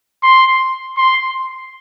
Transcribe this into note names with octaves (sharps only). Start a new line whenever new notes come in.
C6
C6